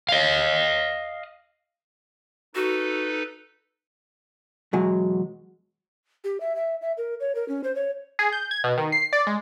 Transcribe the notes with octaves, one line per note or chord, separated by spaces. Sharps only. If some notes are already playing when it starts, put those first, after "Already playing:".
D#5 F5
D#4 F#4 A4 B4
E2 B2 F#3 G#3 G#5
G4
E5
E5
E5
A#4
C#5
A#4
C#4
C5
C#5
G#4
G6
G#6
B2
D#3
C7
D5
G#3